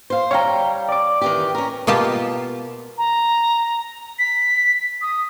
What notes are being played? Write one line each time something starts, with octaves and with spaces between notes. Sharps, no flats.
C5 F5
G3 C#5 F5 G5 A#5
D5 D6
D#3 E3 G4
C#4 A#4
B2 A#3 F4 G4 A5
A#5
B6
D#6